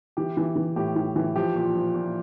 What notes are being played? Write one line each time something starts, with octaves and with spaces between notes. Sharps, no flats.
E3 G4
E3
E3
A2 G4
E3
E3
F3 G4
A#2
F3
A#2